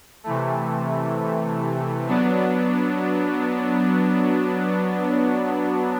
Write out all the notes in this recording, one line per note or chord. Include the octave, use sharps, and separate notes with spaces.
C3 E3 A3
F#3 B3 D4